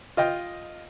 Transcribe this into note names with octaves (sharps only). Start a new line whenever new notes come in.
F4 D#5 G5